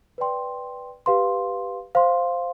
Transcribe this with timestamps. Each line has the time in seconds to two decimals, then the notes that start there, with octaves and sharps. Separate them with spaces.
0.18 B4 D5 G5 C6
1.06 G4 B4 F5 C6
1.95 C5 F5 C6